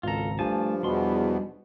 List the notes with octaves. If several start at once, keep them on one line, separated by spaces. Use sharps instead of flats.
G#1 C#2 F4 A4 A#5
G2 F3 A3 G#5 A5
E2 B2 G3 D4 C6